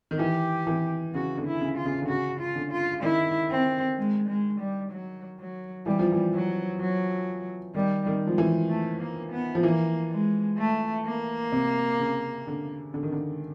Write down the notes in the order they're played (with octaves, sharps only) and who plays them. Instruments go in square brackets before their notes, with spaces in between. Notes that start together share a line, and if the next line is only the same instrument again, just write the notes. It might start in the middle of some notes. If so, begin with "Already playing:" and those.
[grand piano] D#3
[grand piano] E3 [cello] G4
[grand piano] E3
[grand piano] C#3 [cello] F#4
[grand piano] D3
[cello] E4
[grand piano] C#3
[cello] F4
[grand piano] C#3
D3
[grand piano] C#3 [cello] F#4
[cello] F4
[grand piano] D3
[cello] F4
[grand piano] D#3 [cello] E4
[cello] C4
G#3
G#3
G3
F#3
F#3
[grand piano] E3 [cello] G3
[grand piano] F3
E3
[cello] F#3
F#3
[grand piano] D#3 [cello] G3
[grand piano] D#3
[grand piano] F3 [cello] G#3
[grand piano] E3
[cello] A3
A#3
B3
[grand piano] F3
[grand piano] E3 [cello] A#3
[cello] G#3
A3
A#3
[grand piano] C3
C#3
D3
D3
D#3
D3